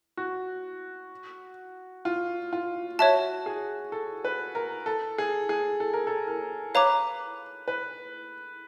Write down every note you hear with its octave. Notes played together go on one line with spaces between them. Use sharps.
F#4
F4
F4
F#4 C#5 E5 A5
G#4
A4
B4
A#4
A4
G#4
G#4
A4
A#4
A4
A#4
B4 C#5 F5 A#5 D6
B4